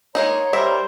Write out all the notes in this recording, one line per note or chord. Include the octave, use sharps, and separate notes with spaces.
G#3 A#3 D#4 C#5 A#5 C6
G3 A#4 C5 E5